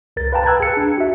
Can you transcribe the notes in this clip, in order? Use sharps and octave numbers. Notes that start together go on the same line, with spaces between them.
C#2 A#4 A6
B4 F5 G5 A5 A#5
A5 E6 F#6 G#6
G#4 A5 C#7
D4
F#4 E5